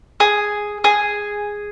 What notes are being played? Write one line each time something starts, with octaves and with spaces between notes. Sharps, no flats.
G#4
G#4